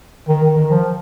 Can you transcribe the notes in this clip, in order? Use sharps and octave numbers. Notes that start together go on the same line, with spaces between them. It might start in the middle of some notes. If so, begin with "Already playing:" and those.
D#3
D#3
D#3
F3